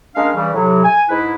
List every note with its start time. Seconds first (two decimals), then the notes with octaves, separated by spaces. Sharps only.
0.16 G#3 A#3 C#4 D4 F5
0.35 C#3 E3 G3
0.53 A2 C3 F#3
0.84 G#5
1.09 G#2 E4 B4